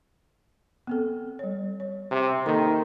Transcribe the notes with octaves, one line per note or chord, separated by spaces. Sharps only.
B3 C4 A4
G3 C#5
C#5
C3
D#3 A#3 A4 C6